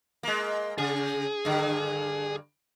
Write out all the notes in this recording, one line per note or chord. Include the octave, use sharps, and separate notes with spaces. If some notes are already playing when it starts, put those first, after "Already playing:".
G#3 A#3
C#3 G#4
G2 D3